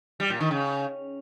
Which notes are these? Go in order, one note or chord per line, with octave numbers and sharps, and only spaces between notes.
G3
A#2
D#3
C#3